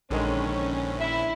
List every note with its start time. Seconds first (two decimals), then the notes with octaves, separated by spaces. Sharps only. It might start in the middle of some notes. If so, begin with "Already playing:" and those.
0.11 A#1 D3 D#3 G#3 C#4
1.00 E4 E5